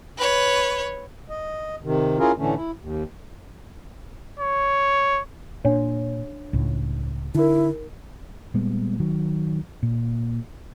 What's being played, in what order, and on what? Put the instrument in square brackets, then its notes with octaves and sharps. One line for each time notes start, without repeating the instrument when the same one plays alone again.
[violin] B4 C#5
[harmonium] D#5
C3 D#3
C#4 E4 F4 G#4 A#4
A2 D3 E3 A3 C#4
E4
D#2
[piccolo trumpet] C#5
[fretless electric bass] A#2 [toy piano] D4 C#5
[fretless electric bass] C#2 A2
[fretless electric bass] D3 [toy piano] D#4 A#4 [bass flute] E4
[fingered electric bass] A#2 G3 G#3 B3
D#3 F#3
A#2